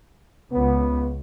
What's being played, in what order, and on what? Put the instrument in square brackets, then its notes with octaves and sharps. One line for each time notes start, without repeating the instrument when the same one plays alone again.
[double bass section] C#2 [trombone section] B3